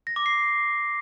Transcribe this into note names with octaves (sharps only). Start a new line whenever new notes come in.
A#6
D6
C7